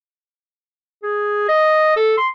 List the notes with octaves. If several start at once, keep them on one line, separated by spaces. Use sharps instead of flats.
G#4
D#5
A4
C6